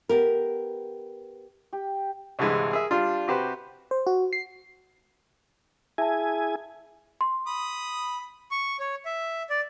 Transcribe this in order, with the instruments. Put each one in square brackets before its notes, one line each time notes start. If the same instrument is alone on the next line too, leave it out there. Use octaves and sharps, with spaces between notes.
[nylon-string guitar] B3 G4 A#4
[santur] G4
[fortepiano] C2 G2 D3 E3 G#3
G#4 A#4 E5
G3 D4 F4
C3 F#4 G4 B4 C5
[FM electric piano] C5
F#4
C7
[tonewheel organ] E4 G#4 G#5 [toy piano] E5 A5
[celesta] C6
[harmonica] B5 D#6
[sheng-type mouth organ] C#6
C#5
E5
D5